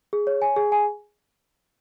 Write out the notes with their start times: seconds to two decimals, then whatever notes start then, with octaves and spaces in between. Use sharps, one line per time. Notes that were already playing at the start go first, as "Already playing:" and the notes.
0.13 G#4
0.27 C#5
0.42 G#5
0.56 G#4
0.72 G#5